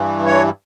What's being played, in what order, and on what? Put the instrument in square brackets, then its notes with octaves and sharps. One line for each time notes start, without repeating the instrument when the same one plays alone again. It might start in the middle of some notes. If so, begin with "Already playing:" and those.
Already playing: [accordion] G2 E3
C#5